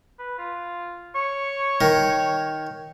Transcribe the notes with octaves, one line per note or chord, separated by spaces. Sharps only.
B4
F4
C#5 C#6
D#3